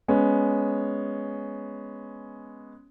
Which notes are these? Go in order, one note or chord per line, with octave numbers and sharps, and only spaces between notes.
G#3 B3 C#4